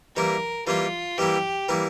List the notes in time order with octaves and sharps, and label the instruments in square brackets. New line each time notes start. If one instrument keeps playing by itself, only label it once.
[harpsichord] E3 G3 A#3 E4 [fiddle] A#4
[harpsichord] E3 G3 A#3 E4 [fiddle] F4
[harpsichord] E3 G3 A#3 E4 [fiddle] G4
[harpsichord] E3 G3 A#3 E4